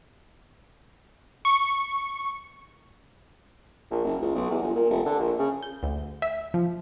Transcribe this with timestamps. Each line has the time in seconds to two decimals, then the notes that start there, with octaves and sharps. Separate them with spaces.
1.45 C#6
3.91 A#1
4.04 F#1
4.21 C#2
4.35 B1
4.50 E2
4.62 G1
4.75 A#2
4.90 F1
5.06 D3
5.19 A#1
5.39 C#3
5.63 G6
5.83 D2
6.22 E5
6.54 F3